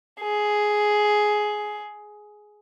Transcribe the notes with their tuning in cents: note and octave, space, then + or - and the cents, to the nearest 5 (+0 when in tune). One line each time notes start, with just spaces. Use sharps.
G#4 +10